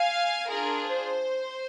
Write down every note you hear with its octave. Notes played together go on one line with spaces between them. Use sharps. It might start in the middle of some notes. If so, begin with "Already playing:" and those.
Already playing: F5 G#5
D4 F4 G#4 A#4
C5